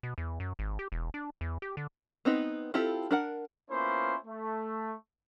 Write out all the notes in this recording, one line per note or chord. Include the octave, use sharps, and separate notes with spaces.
B2
E2
F#2
G#1
G4
E1
D4
E2
G4
D3
B3 C4 D#4 B4
C4 E4 F4 G4 A4
D4 A#4 F#5
A#3 B3 C#4 E4 F4 C5
A3